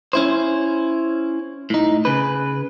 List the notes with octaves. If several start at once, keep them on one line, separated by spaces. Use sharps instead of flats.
C#4 E4 C5
A2 D#4
C#3 B4